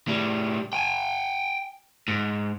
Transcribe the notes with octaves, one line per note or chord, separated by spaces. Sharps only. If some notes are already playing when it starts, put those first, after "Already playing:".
A2 G3
G5 G#5
G#2